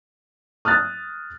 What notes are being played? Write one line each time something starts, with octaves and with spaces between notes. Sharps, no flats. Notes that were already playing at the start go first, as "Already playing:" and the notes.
D#6 F6 F#6 A6